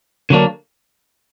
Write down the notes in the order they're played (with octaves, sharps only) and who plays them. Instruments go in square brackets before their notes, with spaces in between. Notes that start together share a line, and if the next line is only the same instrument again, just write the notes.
[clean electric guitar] D3 F#3 A#3 D4